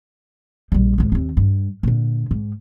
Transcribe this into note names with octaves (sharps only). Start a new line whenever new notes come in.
A#1 G3
C#2 G#2
D#2 C4
G2
A#2 D3
G#2